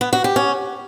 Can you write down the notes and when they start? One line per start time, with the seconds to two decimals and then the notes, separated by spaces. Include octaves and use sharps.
0.01 B3
0.13 F#4
0.24 G4
0.36 C#4